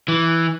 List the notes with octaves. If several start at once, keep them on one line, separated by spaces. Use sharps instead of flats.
E3